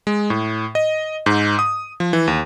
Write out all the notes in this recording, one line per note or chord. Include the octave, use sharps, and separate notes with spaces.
G#3
A2
D#5
G#2
D#6
F3
E3
D#2